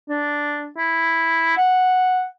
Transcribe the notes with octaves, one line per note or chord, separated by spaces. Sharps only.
D4
E4
F#5